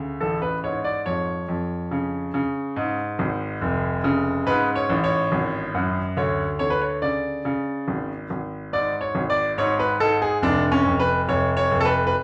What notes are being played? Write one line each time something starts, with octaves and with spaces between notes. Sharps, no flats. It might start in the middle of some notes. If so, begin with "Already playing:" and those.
Already playing: D2 C#3
A1 A4
B4
G#2 C#5
D5
F2 C#5
F2
C#3
C#3
G#2
G#1
F1
C#3
G#2 B4
C#5
A1
C#5
G#1
F#2
D2 C#5
D3 C#5
B4
C#5
C#3 D5
C#3
G#1
G#1
G#2 D5
C#5
G#1
D5
G#2 C#5
B4
G#2 A4
G#4
F1 D4
C#4
F1
B4
F1 C#5
C#5
F1
A4
B4
B4